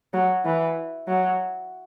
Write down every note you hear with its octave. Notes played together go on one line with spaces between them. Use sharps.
F#3
E3
F#3